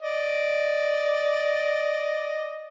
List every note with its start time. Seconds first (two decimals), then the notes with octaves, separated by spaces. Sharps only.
0.02 D5 D#5